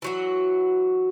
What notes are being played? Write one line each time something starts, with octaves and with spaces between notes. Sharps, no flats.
E3 F#3 F#4